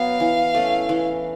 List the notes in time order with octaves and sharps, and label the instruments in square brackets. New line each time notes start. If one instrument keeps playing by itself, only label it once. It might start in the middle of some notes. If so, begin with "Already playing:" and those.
Already playing: [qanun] F#3 B3 [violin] F5
[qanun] E3
A3 C#4
E3